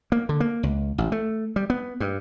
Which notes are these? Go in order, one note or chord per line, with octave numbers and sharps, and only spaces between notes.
A#3
D3
A#3
C#2
A1
A3
G3
B3
G2